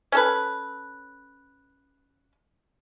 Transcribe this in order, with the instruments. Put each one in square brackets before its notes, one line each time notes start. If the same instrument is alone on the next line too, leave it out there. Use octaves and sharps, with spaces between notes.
[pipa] C#4 A4 B4